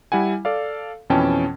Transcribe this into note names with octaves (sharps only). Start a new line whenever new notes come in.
G3 E4 F#5 G#5
A4 D5 F5
F2 B2 E3 C#4 G5 A5